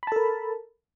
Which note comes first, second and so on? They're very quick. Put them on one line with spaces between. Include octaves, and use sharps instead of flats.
B5 A5 A4 A#4